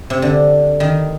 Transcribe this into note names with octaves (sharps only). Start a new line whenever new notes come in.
C3
D3
D#3